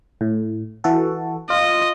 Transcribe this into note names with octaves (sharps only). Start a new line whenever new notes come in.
A2
E3 F#4 A4
F4 D#5